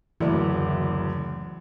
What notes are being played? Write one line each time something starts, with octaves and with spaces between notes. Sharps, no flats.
F#1 D2 E3 D5